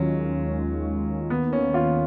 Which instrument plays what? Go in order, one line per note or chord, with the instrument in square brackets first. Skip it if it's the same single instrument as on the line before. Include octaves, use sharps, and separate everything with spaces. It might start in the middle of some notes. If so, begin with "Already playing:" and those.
Already playing: [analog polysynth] D#2 D#3 G#3 C#4 F4 [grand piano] F#3
[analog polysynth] D#2 D#3 A#3 [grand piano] B3
[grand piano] C#4
F4